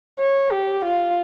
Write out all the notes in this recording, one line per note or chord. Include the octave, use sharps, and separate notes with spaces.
C#5
G4
F4